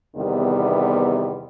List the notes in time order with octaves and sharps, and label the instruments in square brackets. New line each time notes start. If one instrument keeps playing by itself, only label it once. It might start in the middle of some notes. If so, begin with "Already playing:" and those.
[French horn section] E2 C3 D#3 G3 B3